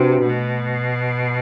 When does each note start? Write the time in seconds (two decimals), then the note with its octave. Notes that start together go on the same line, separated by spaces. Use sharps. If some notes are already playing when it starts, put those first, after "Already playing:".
Already playing: C3 D4 F#4 B4
0.26 B2 A3